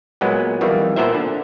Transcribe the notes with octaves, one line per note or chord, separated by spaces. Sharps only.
A#2 F#3 G#3 B3
F2 D#3 E3 G3
A#2 B3 A#4 C5 E5
D3